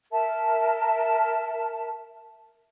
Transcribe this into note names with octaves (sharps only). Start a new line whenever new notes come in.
A#4 E5 A5